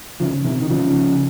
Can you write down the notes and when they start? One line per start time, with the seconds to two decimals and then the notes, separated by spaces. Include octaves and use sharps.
0.20 C#3 F3
0.45 C3 D#3
0.61 D#3
0.70 C#3 F3